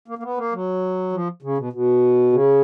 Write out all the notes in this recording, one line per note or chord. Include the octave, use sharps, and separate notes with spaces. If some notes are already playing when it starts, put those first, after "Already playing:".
A#3
A#3
B3
A#3
F#3
F3
C#3
B2
B2
C#3